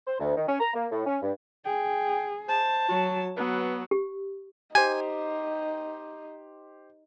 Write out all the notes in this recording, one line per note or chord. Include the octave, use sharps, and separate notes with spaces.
C5
D2
D#3
C#4
A#5
A#3
A2
C#4
G2
G#4 G5
C5 A5
F#3 F#4
F#3 B3 B4
G4
D#4 G4 C5 G#5